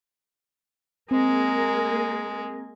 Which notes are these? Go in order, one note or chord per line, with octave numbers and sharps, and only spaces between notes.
G#3 A#3 C4 G#4 A#4